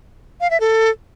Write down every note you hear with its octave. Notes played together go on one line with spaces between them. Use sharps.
F5
E5
A4